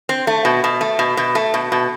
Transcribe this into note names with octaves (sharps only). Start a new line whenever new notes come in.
C4
A3
B2
B2
A3
B2
B2
A3
B2
B2